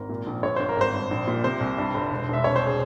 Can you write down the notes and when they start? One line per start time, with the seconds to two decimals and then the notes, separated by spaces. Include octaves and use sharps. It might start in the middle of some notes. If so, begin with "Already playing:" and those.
Already playing: G#1 A#4
0.09 A#2
0.27 A#1
0.43 G1 C#5
0.56 G1 C5
0.69 A#4
0.76 G#1 C5
0.93 G2
1.11 A#1
1.27 A#2
1.44 C3 C5
1.61 C2
1.78 G2
1.94 G1
2.10 E1
2.28 E1 E5
2.44 C2 C#5
2.56 C5
2.67 G#4